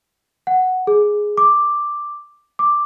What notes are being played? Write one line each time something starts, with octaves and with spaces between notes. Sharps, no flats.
F#5
G#4
D6
D6